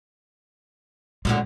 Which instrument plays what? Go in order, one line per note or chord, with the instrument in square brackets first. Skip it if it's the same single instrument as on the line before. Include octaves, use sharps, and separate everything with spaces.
[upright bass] A#1 G#3 [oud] F#2 A2 D3